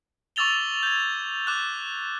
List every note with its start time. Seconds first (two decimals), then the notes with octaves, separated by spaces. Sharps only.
0.36 C#6 D6 E6 A6 F7 G7
0.83 G6 G#6
1.47 D6 F#6